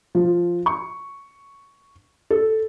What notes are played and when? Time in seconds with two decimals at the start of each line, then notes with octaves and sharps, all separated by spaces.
0.15 F3
0.66 C#6
2.30 A4